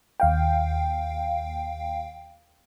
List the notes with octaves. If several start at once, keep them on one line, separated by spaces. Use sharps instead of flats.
D#2 F5 G5